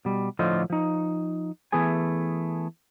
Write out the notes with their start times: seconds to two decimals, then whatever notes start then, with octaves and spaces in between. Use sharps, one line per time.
0.05 B2 G3
0.39 A2 D3 F3 F4 C5 D#5
0.70 F3 D#4
1.72 E3 A3 B3 G#4 G#5